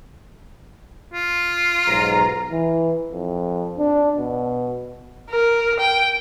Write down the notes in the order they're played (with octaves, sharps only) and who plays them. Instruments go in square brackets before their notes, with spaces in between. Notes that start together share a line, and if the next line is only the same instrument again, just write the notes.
[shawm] F4
[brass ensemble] B1 G#2 A#5
[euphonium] E3
F2
D4
B2
[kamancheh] A#4
G5